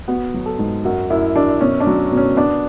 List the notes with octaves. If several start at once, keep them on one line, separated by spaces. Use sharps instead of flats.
B3 F#4
F#3
A4
G#2
F#2 F#4
F#2 E4
F#2 D4
B2 C#4
D4
F#3
B2
C#4
B3 D4